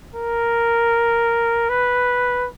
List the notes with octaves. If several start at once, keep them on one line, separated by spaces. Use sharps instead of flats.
A#4
B4